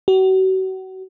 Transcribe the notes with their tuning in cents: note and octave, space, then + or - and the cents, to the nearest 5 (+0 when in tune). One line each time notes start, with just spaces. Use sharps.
F#4 +35